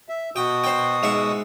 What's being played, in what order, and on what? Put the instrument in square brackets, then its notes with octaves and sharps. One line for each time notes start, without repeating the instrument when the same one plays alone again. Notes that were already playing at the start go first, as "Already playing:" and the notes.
[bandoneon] E5
[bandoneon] B2 F#4 D#6 [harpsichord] G5
[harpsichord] C5 G5
G#2 E5 F#5